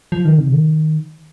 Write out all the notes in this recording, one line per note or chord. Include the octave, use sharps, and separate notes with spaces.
F3
D#3
C3
D#3